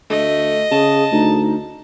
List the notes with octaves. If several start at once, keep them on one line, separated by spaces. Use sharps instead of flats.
D2 A3 D#5
C#3 G#4 A5
D2 D#4